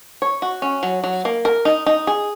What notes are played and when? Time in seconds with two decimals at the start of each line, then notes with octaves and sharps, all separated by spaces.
0.22 C#5
0.42 F#4
0.62 C#4
0.83 F#3
1.04 F#3
1.25 A#3
1.45 A#4
1.65 D#4
1.86 D#4
2.07 G#4